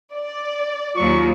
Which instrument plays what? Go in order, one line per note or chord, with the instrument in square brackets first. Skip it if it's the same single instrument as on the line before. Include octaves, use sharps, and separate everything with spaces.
[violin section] D5
[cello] D#2 F#3 [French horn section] F4 [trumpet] C#6